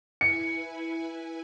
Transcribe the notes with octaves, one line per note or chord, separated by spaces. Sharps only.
E4 B4 G#5 C#7